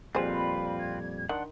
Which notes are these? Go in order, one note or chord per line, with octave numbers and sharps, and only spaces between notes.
F2 A#2 G3 C4 F4 G#4 B4 C5
B5
G#6
D#3 D4 F#5 C6